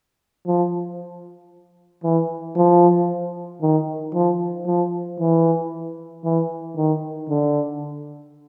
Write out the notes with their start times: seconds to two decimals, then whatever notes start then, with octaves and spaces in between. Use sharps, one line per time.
0.47 F3
2.04 E3
2.56 F3
3.62 D#3
4.14 F3
4.66 F3
5.20 E3
6.24 E3
6.76 D#3
7.30 D3